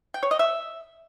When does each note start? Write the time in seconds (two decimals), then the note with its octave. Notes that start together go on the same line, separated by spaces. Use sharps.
0.14 G5
0.23 C#5
0.31 D#5
0.39 E5